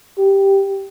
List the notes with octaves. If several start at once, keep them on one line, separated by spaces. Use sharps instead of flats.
G4